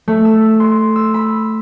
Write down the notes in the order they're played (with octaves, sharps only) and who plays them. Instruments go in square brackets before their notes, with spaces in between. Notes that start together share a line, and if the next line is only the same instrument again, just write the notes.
[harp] A3
E6
C6
E6
B5